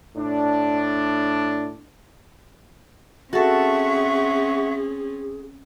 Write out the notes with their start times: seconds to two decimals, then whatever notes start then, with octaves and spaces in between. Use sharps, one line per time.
0.16 A2 D4
3.33 C4 C#4 F#4 G#4 A4 E5 F#5 C#6